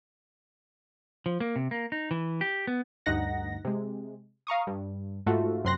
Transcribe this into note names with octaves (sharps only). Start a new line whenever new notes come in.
F3
A#3
C3
A#3
D#4
E3
G4
B3
D2 G2 D#4 F#5 A#6
C3 G#3
F5 A#5 C#6 D#6
G2
G#2 A3 F4 F#4 A4
F#2 C3 C6 F#6 A#6